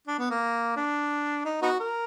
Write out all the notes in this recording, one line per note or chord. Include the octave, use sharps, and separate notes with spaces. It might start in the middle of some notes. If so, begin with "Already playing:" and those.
D4
B3
A#3
D4
D#4
B3 D#4 F#4
A#4